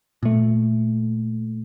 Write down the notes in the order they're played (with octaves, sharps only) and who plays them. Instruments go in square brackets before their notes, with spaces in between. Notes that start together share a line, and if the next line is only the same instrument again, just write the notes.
[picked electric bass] A#2 A3